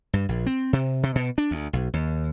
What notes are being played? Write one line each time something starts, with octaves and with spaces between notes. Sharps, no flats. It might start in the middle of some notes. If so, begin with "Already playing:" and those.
G2
A#1
C4
C3
C3
B2
D4
D2
B1
D#2